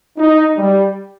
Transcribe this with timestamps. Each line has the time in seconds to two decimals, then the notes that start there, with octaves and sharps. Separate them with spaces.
0.18 D#4
0.57 G3